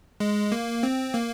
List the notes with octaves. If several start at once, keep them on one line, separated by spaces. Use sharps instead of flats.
G#3
A#3
C4
A#3